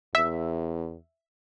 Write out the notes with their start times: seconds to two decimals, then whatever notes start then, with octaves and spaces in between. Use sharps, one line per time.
0.15 E2 E5